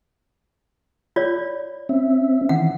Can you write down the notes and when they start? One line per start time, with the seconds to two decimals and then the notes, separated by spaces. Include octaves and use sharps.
1.16 F4 C#5 D5
1.89 C4 C#4 E5
2.49 D#3 E3 F#5